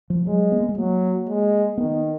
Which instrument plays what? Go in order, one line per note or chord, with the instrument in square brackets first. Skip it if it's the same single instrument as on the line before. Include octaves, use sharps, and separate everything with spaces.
[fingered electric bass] F3
[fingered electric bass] F#3 [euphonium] G#3
[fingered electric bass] B3
A#3
G#3
[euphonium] F#3 [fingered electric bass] A#3
[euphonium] G#3
[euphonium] D#3 [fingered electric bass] B3